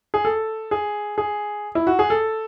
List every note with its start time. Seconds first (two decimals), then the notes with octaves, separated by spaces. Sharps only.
0.14 G#4
0.25 A4
0.71 G#4
1.18 G#4
1.75 E4
1.87 F#4
1.99 G#4
2.10 A4